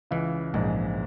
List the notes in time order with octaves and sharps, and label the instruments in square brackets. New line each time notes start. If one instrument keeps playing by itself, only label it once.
[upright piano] C#2 C#3 [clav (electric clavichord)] E3
[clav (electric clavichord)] A#1 [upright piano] G#2 G#3